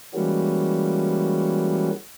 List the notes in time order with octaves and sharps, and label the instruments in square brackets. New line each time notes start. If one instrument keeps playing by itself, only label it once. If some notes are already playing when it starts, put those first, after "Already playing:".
[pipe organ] E3 G3 G#3 A#3 C#4 F#4